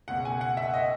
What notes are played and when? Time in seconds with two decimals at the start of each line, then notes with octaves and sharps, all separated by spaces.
0.08 C#2 B2 F#5
0.25 G#5
0.41 F#5
0.57 E5
0.74 D#5